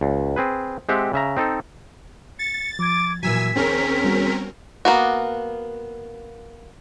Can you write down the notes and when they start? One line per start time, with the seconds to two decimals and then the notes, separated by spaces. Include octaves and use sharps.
0.01 C#2
0.36 C4 G#4 B4
0.89 G#3 C4 G4 E5 F#5
1.13 C#3 E5 A#5
1.37 C4 D#4 A4
2.39 A6 C#7
2.79 F3 D6 G#6
3.23 A#2 E3 F#3 G#5 E6 B6
3.56 D#2 C4 C#4 G#4 A#4
4.04 G3 B3 F#4
4.85 A#3 B3 F#4